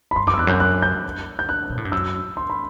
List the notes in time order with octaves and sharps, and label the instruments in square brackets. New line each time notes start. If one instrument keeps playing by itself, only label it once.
[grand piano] B5
[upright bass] G2 [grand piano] C6
[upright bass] F#2 [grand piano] D6
[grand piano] E6
[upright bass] E2 [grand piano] F#6
[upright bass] F#2 [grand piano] G6
[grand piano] F#6
G6
G6
F#6
[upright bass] B2
A2
G2
[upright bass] F#2 [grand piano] E6
[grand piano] C6
B5